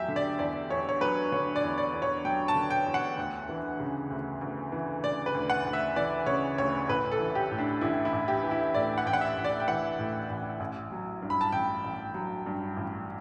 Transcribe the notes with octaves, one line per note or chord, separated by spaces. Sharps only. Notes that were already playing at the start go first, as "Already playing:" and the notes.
Already playing: E2 F#3 G4 E5
D3
D5
E2 D5
E2 C#5
C#5
F#3 B4
D3 C#5
D5
E2
D5
E2
C#5
F#3 G5
A5
D3
G5
E2
F#5
D2
E3
C#3
D2
D2
E3
C#3 D5
B4
D2
F#5
D2
E5
E3 D5
C#3 C#5
D2 C#5
A1 B4
A4
E3
G4
A2
D4
A1 E4
E4
A1
G4
E3
E4
A2 D5
F#5
A1 G5
F#5
E5
A1
D5
G5
E3 F#5
A2
A1
A1
F#3
G2
B5
A5
A1 G5
A1
F#3
G2
A1